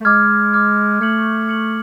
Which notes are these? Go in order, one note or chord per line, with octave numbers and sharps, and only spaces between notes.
A3
G#3 D6 F6 G#6
D6 F6 G#6
A3 F6 G#6 C#7 F#7
F6 G#6 C#7 F#7